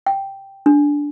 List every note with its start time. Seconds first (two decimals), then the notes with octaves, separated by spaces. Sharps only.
0.07 G5
0.66 D4